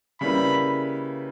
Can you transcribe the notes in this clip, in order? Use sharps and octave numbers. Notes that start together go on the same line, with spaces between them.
C#3 G3 A#3 E4 B4 B5